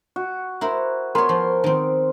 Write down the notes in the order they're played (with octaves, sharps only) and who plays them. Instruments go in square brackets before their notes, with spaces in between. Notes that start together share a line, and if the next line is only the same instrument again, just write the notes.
[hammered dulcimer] F#4
[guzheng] E4 A#4 C5
[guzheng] B3 C#5 [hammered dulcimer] A#4 C6
[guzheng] F3
D#3 C4